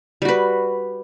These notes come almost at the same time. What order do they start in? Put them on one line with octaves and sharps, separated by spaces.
G3 F#4 B4